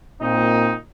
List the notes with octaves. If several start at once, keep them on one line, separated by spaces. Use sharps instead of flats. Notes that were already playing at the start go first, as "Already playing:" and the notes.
A#2 C4 D#4